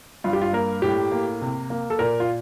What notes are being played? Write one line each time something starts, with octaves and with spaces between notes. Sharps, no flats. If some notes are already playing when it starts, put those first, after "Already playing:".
G2 F4
G4
F4
A#3 A#4
A2 G4
A#3
C3
A#3
A4
A#2 A#4
F4